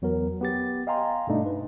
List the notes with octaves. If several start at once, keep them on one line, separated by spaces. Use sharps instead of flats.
E2 F#3 B3 A#4
B3 G4 A6
D#5 F5 G5 G#5 A#5 C6
G2 B2 A3 D4 D#4
B4